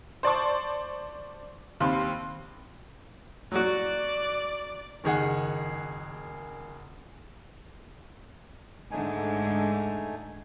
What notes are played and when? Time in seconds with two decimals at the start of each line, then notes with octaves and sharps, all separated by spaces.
0.23 C5 D5 A5 C#6
1.80 D#2 C4 F5 B5 C6
3.52 F#3 F#4 D5
5.04 F#1 D#3 G#4 F#5
8.91 G#2 D3 G#3 A3 D#4 G#5